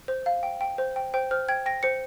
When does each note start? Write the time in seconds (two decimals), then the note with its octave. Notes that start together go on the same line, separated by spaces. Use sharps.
0.08 C5
0.26 F5
0.43 G5
0.61 G5
0.78 C5
0.96 G5
1.14 C5 G5
1.31 C5 F6
1.48 G5 G#6
1.66 G5 A#6
1.83 C5 C#7